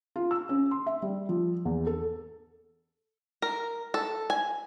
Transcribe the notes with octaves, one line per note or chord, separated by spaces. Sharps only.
F4
E6
C#4
C6
E5
G3
F3
E2
A4
A#4
A4
G#5